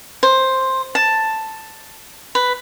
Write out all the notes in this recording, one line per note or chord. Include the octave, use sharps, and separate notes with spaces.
C5
A5
B4